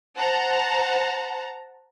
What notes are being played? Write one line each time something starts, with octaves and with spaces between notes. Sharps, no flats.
C5 F#5 A5 A#5